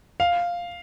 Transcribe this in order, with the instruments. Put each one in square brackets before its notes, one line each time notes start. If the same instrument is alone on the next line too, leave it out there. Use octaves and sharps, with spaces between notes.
[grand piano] F5